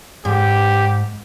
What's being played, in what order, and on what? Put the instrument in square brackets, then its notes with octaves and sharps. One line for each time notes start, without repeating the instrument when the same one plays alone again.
[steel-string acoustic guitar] G#2 [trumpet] G4